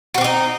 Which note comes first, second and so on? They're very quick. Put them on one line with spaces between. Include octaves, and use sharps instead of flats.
F#4 C4 G4 D#4